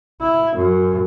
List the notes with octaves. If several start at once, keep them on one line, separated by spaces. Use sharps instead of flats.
E4
F#2